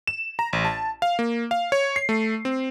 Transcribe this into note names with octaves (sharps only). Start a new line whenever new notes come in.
E7
A#5
A1
A5
F5
A#3
F5
C#5
C7
A3
C4